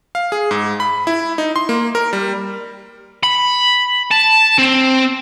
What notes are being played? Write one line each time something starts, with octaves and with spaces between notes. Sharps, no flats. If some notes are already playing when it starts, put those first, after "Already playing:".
F5
G#4
G#2
B5
E4
D#4
C6
A#3
A#4
G3
B5
A5
C4